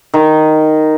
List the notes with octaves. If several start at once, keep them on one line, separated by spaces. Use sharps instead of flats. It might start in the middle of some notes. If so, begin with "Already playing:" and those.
D#3